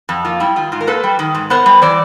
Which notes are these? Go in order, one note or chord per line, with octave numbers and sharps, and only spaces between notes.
F2
A#3 F4
G3 E4
D#3 F4
G#2 F4
A#4
A#3 A4 B4
G3
D#3
G#2
B3 A#4 C5
G3
E3 C5 D5